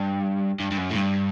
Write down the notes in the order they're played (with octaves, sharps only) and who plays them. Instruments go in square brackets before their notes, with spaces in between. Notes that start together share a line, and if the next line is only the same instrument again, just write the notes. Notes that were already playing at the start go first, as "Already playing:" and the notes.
Already playing: [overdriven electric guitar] G2
G2
G2
F#2
A2
G2